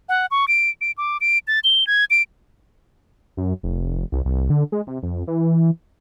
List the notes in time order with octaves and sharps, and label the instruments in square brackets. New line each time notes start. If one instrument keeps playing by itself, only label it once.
[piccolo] F#5
C#6
D7
D7
D6
D7
A6
G7
G#6
D7
[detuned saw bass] F#2
F1
C2
C2
D3
G#3
C3
F2
E3